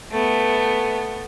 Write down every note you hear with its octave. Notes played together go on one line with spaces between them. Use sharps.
A3 B3